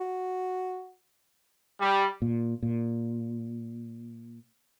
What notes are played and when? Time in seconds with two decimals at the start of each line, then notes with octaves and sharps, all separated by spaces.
0.01 F#4
1.81 G3
2.22 A#2
2.63 A#2